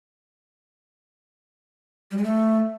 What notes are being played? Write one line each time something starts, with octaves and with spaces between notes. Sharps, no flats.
G3
G#3
A3